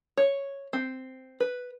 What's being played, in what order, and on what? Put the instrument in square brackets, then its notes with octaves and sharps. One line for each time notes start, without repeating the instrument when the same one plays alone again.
[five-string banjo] C#5
C4
B4